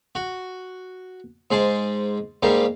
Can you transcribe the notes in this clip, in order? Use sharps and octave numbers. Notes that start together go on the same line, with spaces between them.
F#4
G#2 G#4 C5 A5
G#2 G3 A#3 G4